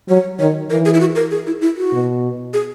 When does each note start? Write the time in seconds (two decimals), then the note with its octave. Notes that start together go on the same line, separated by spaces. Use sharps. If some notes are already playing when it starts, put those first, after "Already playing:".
0.09 F#3 C#5
0.39 D#3 C#5
0.70 E3 A#4
0.85 G#4
0.94 E4
1.00 F#4
1.16 A#4
1.31 G#4
1.47 E4
1.61 E4
1.77 F#4
1.92 B2
2.54 G#4